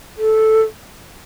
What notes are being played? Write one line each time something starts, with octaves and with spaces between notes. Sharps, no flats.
A4